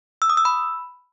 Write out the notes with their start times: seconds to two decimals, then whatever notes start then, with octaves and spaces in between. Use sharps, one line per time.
0.22 E6
0.29 D#6
0.37 E6
0.45 B5